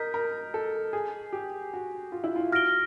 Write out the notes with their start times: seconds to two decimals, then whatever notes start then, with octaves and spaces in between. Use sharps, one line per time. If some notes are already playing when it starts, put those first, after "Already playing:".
Already playing: A#4 D#5 G6 B6
0.14 A#4
0.54 A4
0.93 G#4
1.33 G4
1.73 F#4
2.12 F4
2.24 E4
2.36 F4
2.52 F#4 F6 A#6 D7 G7